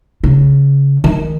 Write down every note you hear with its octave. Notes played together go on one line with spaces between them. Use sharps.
C#3
D#3